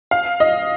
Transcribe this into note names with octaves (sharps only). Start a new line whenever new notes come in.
F5
D#5